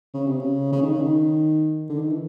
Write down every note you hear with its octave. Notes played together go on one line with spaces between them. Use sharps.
C#3
C3
C#3
C#3
D#3
C#3
D#3
D3
D#3
E3